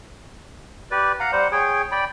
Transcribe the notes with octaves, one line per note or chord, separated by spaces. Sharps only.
G4 B4 D5
F5 F#5 A#5
G3 C5 F#5
G#4 C#5 G5
D5 G5 B5